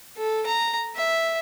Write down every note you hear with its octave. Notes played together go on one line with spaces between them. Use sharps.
A4
A#5
E5